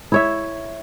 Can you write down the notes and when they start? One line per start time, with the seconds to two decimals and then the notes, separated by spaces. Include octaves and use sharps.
0.12 E4 C#5 E5